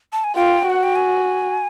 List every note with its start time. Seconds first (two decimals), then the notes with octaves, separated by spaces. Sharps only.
0.13 A5
0.24 G#5
0.36 F4 G5
0.66 F#4 F#5
0.83 G5
0.96 G#5